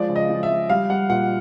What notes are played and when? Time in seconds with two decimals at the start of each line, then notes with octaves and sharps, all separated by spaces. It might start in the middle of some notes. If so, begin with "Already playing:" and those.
Already playing: F3 G#3 D5
0.09 C#3
0.16 D#5
0.29 F3
0.43 E5
0.50 F3
0.69 G3 F5
0.90 G3 F#5
1.09 A#2 F#5